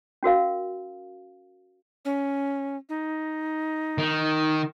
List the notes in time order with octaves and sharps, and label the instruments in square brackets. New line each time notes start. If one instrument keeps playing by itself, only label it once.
[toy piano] C#4 F#4 A#4 F5
[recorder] C#4
D#4
[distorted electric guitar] D#3